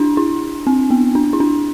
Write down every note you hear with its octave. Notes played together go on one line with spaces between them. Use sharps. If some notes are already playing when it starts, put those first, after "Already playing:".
Already playing: D4 E4
E4
C4
B3
D4
E4
D4